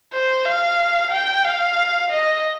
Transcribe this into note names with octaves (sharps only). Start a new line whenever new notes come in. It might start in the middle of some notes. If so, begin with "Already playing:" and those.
C5
F5
G5
F5
D#5